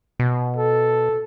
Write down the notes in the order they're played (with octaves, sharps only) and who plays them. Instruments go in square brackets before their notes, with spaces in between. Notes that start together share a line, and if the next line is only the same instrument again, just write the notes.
[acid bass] B2
[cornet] A4